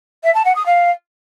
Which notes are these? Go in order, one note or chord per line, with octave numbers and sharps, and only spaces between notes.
E5
A5
F#5
D#6
F5